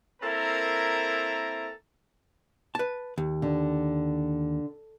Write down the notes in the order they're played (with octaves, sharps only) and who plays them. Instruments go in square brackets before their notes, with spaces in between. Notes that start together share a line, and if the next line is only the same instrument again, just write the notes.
[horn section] A#3 C4 E4 A4 A#4 A#5
[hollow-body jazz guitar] B4 A5
D#2
[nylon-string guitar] D3